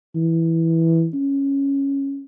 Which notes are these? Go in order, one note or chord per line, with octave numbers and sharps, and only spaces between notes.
E3
C#4